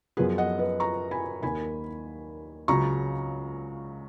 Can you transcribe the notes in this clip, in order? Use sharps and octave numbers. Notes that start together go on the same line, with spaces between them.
F#2 F3 B3 G#4 B4
D#5 F#5
B4 D#5
A#5 C#6
G#5 B5
D#2 D#3 A#3 G#5 B5
C#2 C#3 F#3 A#5 C#6